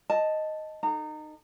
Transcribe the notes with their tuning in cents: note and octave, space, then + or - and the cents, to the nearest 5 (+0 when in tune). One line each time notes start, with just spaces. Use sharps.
D#5 +0 A5 +0
D#4 -25 A4 +0 A#5 -25